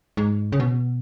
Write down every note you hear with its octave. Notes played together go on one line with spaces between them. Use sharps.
G#2
C#3
B2